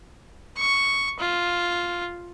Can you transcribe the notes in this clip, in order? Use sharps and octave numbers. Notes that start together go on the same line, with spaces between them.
C#6
F4